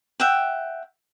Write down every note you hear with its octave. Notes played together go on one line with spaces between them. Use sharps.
E5 F#5 G5